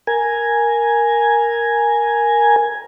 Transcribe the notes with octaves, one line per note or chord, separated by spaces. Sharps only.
A#4 G#5